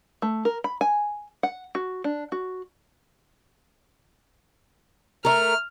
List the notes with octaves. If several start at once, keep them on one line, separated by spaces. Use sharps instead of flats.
A3
A#4
B5
G#5
F#5
F#4
D4
F#4
A3 A#4 F6